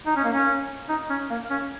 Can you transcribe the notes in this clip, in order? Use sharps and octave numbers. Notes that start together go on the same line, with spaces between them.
D#4
C#4
A#3
C#4
D#4
C#4
A#3
C#4